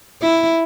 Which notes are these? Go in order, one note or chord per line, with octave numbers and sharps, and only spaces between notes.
E4